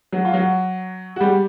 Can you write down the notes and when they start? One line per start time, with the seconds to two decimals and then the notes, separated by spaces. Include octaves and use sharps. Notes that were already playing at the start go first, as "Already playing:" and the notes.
0.12 F#3 F#4
0.25 F4
0.34 F#3 F#4
1.16 F#4
1.20 G3 G4